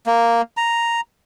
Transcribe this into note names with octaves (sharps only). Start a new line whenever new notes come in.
A#3
A#5